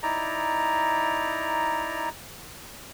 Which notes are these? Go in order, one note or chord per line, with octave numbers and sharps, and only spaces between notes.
D#4 E4 D5 A#5